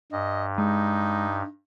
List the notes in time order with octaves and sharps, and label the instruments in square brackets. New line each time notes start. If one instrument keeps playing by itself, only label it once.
[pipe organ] G2 [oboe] D#5
[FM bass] G#3 [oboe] D#4